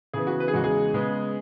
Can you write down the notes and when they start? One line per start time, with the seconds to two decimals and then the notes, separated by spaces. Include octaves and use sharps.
0.13 C#3 E3 B3 G#4
0.27 F#4
0.40 B4
0.48 G#4
0.53 E2 C#3 G#3 F#4
0.64 G#4
0.94 C#3 G#3 B3